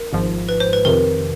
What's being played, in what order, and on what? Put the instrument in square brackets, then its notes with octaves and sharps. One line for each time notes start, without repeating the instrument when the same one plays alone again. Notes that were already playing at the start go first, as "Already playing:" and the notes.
Already playing: [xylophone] A#4
[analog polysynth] G#1 G#2 F3
[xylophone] B4
C5
B4
[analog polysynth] F2 C3 D#3 [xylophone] A#4